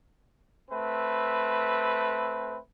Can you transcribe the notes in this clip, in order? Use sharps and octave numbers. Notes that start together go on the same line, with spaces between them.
A3 C4 B4